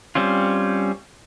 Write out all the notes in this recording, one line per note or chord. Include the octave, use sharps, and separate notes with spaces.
G3 C4 C#4 F4